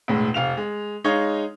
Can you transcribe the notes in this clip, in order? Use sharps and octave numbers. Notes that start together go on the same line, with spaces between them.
E1 A2 G#3
F1 F5 F7
G#3
G#3 D#4 C#5 F5